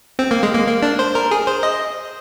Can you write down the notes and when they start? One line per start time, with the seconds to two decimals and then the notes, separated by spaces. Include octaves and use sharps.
0.19 C4
0.31 A#3
0.43 G#3
0.55 A#3
0.67 A#3
0.83 D4
0.99 C5
1.15 A#4
1.31 G#4
1.47 C5
1.63 D#5